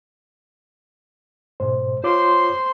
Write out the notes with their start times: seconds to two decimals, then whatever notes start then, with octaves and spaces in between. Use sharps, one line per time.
1.60 G#2 B2 C5
2.04 F4 C5 C#5 C6 D6